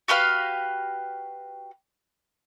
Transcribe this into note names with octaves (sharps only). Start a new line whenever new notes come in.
F#4 G4 B4 F5